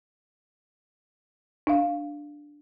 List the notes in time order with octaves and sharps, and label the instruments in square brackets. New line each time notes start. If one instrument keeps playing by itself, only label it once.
[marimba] D4 F5